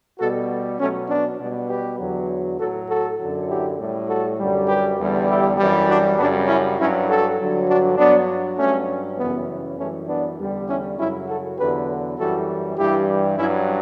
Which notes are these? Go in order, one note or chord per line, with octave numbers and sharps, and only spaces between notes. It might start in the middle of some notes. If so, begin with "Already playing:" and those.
B2 G3 F#4 A4
B2 F#3 A3 C#4
B3 D4
B2 G3
G4 B4
E2 D3 F#3
A2 F#3 F#4 A4
F#4 A4
F#2 D3 F#3
E4 G4
A2 G3
F#4 A4
F#2 D3 G3
G4 B4
E2 D3 G3
E4 G4
F#2 E3 G3
D4 F#4
F#2 C#3 G3 B3 D4
C#4 E4
G2 F#3 C#4 E4
F#4 A4
G2 D3 F#3
D4 F#4
G2 F#3 B3 D4
G2 F#3 A3 C#4
F#2 C#3 E3 G3 B3
F#2 E3 G3 A3 C#4
B3 D4
E2 D3 G3
C#4 E4
F#2 C#3 F#3 C#4 E4
F#4 A4
E2 D3 F#3 G4 B4
F#2 E3 G3 F#4 A4
G2 E3 G3 E4 G4
G2 F#3 C#4 E4